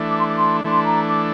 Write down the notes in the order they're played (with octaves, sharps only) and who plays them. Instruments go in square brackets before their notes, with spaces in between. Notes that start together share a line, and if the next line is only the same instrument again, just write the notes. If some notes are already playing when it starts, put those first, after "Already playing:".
Already playing: [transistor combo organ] E3 A3 D4
[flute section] D6
C6
D6
C6
[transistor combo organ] E3 A3 D4 [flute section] C6
[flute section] A#5
D6